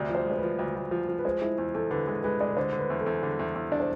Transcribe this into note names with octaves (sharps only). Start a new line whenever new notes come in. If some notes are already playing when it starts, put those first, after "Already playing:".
Already playing: D2 C3 D5
F3
C5
G#3
C5
B4
F3
D2
D2
F3
F3
B4
G#3 C5
G#3 E4
E2
E2 A4
D3 B4
G#3 A4
G#3 B4
G#3 D5
B4
D3 C5
D3
B4
E2
A4
E2
D3
E2
E2
D4 D5
C5